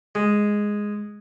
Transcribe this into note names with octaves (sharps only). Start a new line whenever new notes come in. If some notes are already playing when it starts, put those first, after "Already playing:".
G#3